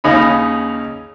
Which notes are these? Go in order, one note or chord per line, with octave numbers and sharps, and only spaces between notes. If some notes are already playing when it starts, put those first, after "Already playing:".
D#2 C#3 C#4 D#4 B5